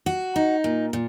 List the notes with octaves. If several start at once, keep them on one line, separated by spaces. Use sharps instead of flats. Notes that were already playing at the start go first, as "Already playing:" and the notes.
F#4
D#4
A#2
A#2